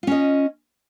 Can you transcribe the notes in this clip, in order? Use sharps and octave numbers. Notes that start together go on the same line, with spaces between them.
C#4 F4 D#5